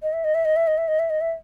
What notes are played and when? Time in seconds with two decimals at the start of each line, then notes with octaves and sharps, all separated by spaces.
0.03 D#5
0.13 E5
0.24 D#5
0.35 E5
0.45 D#5
0.56 E5
0.67 D#5
0.78 E5
0.88 D#5
0.99 E5
1.10 D#5
1.21 E5